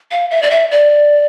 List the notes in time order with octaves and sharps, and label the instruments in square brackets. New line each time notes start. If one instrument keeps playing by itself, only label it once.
[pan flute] F5
E5
D5
E5
D5